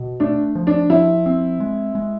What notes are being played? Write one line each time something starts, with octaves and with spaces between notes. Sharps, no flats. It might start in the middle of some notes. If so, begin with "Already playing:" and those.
Already playing: B2
A3 D4
F3
D4
F3 E4
C4
G#3
G#3